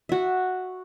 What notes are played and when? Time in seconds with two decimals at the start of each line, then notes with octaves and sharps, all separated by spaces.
0.09 F#4 E5